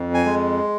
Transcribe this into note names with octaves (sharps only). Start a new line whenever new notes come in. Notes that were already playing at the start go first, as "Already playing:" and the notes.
Already playing: F2
G#5
G#3